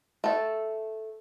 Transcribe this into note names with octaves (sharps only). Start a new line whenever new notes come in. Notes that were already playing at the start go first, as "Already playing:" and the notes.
A3 A4